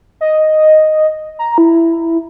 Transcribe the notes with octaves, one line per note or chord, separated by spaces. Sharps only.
D#5
A#5
E4